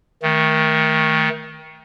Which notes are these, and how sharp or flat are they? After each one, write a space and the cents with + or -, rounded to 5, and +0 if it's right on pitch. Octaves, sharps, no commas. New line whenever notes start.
D#3 +20 A3 +0